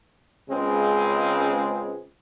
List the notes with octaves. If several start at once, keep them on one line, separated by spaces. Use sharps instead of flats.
C#2 C#3 G#3 C4